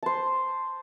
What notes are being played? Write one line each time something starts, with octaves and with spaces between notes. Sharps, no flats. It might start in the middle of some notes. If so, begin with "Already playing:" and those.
C5 A5